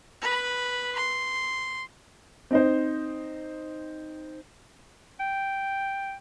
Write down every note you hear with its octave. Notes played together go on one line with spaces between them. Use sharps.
B4 B5
C6
C4 D#4 C5
G5